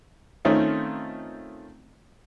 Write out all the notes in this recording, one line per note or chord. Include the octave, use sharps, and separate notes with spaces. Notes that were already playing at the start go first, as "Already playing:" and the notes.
D#3 A3 C4 C#4 D#4 F4